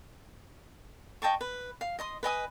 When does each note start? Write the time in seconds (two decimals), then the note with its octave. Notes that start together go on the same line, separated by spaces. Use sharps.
1.22 D#5 G5 A5 C#6
1.41 B4
1.81 F5
1.99 D#5 C6 D#6
2.23 B4 D#5 G#5 D#6